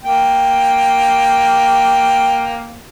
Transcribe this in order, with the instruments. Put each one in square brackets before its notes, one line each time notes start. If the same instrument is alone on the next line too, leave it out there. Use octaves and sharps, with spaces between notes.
[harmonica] A#3 G5